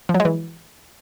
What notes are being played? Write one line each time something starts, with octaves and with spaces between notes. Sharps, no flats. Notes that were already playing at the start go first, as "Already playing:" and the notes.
F3
F#3
G#3
E3